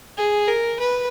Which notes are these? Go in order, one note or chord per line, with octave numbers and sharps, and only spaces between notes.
G#4
A#4
B4